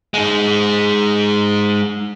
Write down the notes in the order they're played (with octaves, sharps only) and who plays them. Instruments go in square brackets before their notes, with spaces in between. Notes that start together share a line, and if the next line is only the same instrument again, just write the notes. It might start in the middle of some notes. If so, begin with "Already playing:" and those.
[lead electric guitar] G#3 D#4